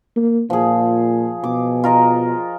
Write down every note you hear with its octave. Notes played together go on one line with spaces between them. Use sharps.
A#3
A#2 F3 G#4
B2 D6
F4 A#4 D#5